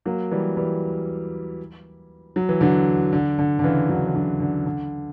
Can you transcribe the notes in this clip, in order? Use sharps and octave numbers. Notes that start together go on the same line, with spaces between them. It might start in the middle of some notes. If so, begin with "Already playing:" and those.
F#3 A#3
E3 G3
E3 G3
F#3
E3
D3 F#3
D3
D3
D3
C#3 E3
D3 F#3
E3
D3 F#3
D3
D3